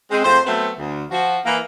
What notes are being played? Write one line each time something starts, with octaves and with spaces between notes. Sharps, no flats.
G#3 C4
F2 A3 C5
F#3 A3 B3 C4
D2
F3 F#4
E3 A#3